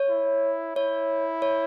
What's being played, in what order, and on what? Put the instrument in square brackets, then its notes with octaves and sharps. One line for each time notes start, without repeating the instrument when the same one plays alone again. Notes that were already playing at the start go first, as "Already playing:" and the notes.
Already playing: [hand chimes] C#5
[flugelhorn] E4
[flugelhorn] E4 [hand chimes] C#5
[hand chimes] C#5